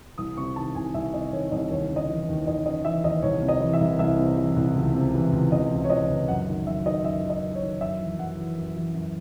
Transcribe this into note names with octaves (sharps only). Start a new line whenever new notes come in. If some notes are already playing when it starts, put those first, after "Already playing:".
C2 D#6
C3 C#6
D#3 A5
C2 G#5
C2 E5
C3 D#5
D#3 C#5
C2 D#5
D#2 C#5
C#3
D#5
E3
D#2
D#2 D#5
C#3 D#5
E3 E5
D#2 D#5
C2 C#5
C3
D#5
E3
E5
C2
C2 E5
C3
E3
C2
C#2
C3
E3
C#2
C#2 D#5
C3
C#5
E3 D#5
C#2
F#2 F#5
D#3
F#2 E5
D#3 D#5
F#2 E5
D#3
D#5
F#2
C#5
D#3
F#2 E5
E3
F#2 F#5
E3
F#2
E3
F#2